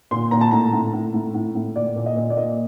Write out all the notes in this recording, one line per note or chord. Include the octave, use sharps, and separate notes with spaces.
A#2 C6
A#2 A#5
A5
A2 A#5
A2
A2
A2
A2
A2
A#2 D5
A#2
D#5
A#2
D5
A#2 D#5